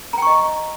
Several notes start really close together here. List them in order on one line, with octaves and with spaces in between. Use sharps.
A#5 G5 C#6 D#5